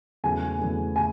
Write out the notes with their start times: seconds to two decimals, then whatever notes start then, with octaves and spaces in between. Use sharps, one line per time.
0.24 E2 C#3 F#3 A3 G#5
0.59 E2 C#3 F#3 A3
0.96 C#3 G#5